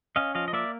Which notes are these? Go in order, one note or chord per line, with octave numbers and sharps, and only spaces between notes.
C#4 D#5 F5
F3 D#5 F5
D#5
A#3 D5 E5